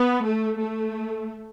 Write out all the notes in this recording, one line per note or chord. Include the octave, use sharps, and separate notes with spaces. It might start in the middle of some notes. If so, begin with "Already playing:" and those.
Already playing: B3
A3
A3